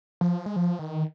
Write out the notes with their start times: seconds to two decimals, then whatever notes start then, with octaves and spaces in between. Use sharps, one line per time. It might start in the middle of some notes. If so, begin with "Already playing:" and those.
0.21 F3
0.46 G#3
0.56 F3
0.79 D#3